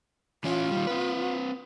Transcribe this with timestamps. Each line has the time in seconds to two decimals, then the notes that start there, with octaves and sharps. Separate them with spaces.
0.44 E3 C#4 E4 F4
0.71 D#3 G3
0.87 C4 B4